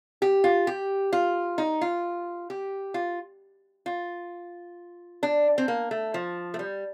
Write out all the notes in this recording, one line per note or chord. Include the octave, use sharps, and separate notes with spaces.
G4
F4
G4
F4
D#4
F4
G4
F4
F4
D4
C4
A#3
A3
F3
A3
G3